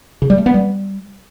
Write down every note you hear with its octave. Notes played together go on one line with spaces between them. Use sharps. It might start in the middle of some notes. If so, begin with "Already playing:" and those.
C#3
G3
A3
B3
G3